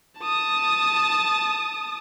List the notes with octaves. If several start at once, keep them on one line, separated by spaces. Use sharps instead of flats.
A5 D#6